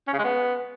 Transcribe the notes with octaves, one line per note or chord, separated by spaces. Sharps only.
C#4
C#3
G#3
B3